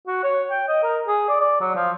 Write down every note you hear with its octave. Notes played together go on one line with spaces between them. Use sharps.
F#4
C#5
G5
D#5
A#4
G#4
D5
D5
F#3
F3